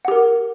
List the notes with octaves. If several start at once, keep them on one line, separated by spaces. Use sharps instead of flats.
G4 A#4 F#5